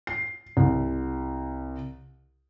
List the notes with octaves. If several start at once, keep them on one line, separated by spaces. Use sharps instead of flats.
C7
C2